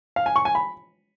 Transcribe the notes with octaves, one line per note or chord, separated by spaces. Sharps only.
F5
G#5
C#6
G#5
B5